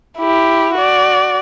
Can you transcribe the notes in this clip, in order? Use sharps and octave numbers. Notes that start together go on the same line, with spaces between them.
E4 G4
F#4 D5